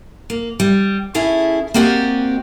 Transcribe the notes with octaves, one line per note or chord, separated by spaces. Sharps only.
A#3
G3
C#4 E4 G#4 A4
A#3 C4 F#4 G4 D5 D#5